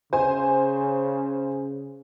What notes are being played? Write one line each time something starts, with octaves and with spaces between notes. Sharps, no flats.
C#3 C5 G#5